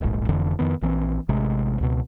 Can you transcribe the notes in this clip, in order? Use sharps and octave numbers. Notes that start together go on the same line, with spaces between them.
D1 A#1 G#2
F1 F2 D3 E3
F2 D#3 B3
A#1 E3 C4
A1 C3 G#3
C#2 B2